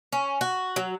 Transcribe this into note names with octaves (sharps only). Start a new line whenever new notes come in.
C#4
F#4
F#3